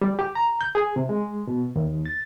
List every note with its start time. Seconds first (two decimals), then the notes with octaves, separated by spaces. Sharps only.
0.02 G3
0.19 G4
0.35 A#5
0.61 G6
0.75 G#4
0.96 C3
1.09 G#3
1.47 B2
1.76 D#2
2.06 A6